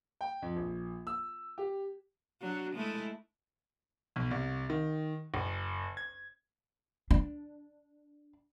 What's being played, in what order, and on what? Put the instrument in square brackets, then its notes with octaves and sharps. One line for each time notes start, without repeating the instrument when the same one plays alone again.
[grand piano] G5
F2
A#1
E6
G4
[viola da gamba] F#3 D4 F#4
G#3 A3 E4
[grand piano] B1
C2
D#3
F#1
G#6
[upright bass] D4